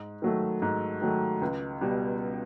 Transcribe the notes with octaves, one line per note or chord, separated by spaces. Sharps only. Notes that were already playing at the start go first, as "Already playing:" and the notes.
Already playing: G#2
D#3 F#3 A3
G#2
D#3 F#3 A3
C#2
B2 G3